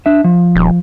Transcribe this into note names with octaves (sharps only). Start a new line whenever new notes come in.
D4 E5
F3
D#1